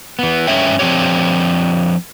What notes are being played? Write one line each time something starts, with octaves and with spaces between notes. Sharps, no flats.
E3 B3
G2 C#4 C#5 E5 G5
F3 C4 D4 G4 C#5